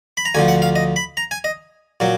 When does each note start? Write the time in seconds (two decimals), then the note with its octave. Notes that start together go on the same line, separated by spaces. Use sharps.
0.17 B5
0.25 A#5
0.34 D2 D3 F3 G#5
0.48 F#5
0.62 F5
0.76 D#5
0.96 B5
1.17 A#5
1.31 G#5
1.44 D#5
2.00 A#2 F#3